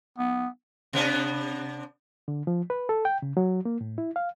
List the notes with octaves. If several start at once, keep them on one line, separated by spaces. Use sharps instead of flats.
B3
C3 B3 D4
D3
F3
B4
A4
G5
C#3
F#3
A#3
A2
E4
F5